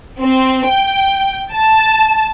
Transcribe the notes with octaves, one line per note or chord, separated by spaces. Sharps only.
C4
G5
A5